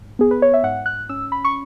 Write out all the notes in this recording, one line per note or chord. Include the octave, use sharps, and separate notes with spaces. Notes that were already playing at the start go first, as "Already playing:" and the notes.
Already playing: G#2
B3 G#4
B4
C#5
E5
G#2 F#5
F#6
C#4 E6
B5
C#6